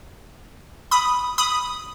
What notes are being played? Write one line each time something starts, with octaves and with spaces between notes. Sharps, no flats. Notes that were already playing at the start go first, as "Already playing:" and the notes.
B5 D#6
B5 D#6